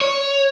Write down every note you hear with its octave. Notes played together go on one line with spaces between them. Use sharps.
C#5